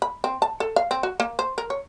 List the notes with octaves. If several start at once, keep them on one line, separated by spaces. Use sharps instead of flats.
B5
C4
A5
A4
F5
C4
F#4
A#3
C5
A#4
C#5